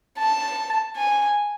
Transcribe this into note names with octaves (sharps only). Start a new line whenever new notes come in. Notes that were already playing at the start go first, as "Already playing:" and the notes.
A5
G#5